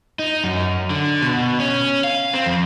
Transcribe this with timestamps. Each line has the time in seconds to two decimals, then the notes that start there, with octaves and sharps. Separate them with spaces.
0.19 D#4
0.44 F#2
0.90 D3
1.22 B2
1.60 C#4
2.04 F5
2.33 C4
2.46 F2